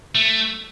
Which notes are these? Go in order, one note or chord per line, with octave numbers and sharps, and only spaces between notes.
A3